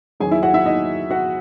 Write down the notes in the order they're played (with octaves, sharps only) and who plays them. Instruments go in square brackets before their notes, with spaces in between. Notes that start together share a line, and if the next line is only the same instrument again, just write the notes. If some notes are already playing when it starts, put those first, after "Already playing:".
[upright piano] E2 D#3 F#3 B3 G#4 G#5
E4 E5
F#4 F#5
E4 E5
D#4 D#5
F#4 F#5